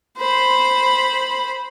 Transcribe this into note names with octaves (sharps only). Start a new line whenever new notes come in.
C5 B5